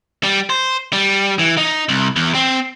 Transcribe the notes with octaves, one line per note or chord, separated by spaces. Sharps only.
G3
C5
G3
E3
D#4
C2
E2
C4